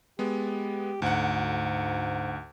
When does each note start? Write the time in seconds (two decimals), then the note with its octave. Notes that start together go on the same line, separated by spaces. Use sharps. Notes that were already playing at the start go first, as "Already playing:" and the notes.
0.19 G#3 B3 G4
1.02 D2 G#2 F#5